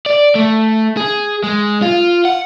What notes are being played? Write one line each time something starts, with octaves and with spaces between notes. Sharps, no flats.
D5
A3
G#4
G#3
F4
F#5